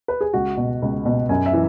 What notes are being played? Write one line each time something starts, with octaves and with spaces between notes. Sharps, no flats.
B4
G#4
C#2 F#4
B2
C#2
B2
F#2 G#5
E5
E3